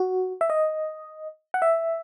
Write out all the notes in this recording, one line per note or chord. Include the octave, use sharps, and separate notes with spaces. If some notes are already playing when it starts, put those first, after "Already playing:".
Already playing: F#4
E5
D#5
F#5
E5